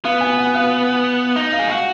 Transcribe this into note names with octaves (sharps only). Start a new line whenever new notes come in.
B3 F5
G#5
F#5
F5
D#4 D#5
F5
G#4
F#4 F5